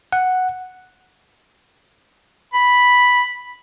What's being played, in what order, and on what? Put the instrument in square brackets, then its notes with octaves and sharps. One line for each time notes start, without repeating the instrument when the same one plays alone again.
[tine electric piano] F#5
[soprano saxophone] B5